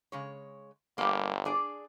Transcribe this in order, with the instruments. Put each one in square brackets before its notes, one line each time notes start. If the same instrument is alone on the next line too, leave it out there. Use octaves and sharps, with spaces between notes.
[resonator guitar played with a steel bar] C#3 G#3 C#5
[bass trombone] G1 [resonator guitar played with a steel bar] G3 A#3
[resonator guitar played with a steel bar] D4 G#4 D5